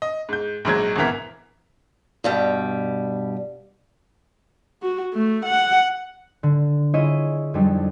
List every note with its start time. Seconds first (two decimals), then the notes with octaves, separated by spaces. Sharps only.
0.02 D#5
0.29 G#2 G6
0.65 A#1 G#2 F#3 G#6
0.96 G#1 E2 B2 E3 A#4 B6
2.24 G2 B2 G3
4.82 F#4
5.14 A3
5.46 F#5
6.43 D3
6.94 E4 F4 G#4 C#5 D#5 E6
7.54 F2 F#3 G3 D4 D#4